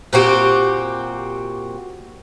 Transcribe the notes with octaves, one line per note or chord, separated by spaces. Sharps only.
A#2 C4 F#4 G4